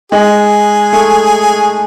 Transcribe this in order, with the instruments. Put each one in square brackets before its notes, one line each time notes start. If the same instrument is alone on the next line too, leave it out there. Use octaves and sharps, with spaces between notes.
[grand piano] G#3 [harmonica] G#4
[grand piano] A3